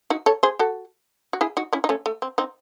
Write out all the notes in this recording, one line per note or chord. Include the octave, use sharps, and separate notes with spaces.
D#4 F#4
A4 C#5
G#4 C5
F#4 A4
F#4
E4 G#4
D#4 F#4
C#4 E4
D#4
A3 C#4
A3
C4
C4 D#4